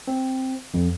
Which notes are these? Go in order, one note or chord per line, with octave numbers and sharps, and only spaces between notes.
C4
F2